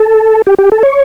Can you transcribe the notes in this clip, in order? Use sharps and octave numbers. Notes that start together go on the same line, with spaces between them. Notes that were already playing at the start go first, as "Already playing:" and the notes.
Already playing: A4
G4
G4
A4
C#5